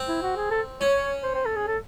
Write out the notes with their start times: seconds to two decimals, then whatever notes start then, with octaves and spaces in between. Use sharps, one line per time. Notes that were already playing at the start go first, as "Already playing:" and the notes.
Already playing: C4
0.08 E4
0.22 F#4
0.36 G#4
0.51 A4
0.81 C#4 C#5
1.23 C5
1.35 C5
1.45 A4
1.56 G#4
1.67 A4